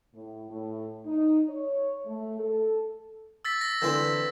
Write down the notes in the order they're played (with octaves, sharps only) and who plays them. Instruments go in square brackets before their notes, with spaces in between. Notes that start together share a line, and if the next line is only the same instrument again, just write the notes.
[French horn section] A2
A2
D#4
C#5
A3
A4
[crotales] E6 A6 B6
A#6
[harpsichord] D3 E3 C4